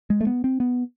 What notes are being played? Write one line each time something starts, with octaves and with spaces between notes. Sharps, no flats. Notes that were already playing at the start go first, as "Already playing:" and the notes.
G#3
A3
B3
C4
B3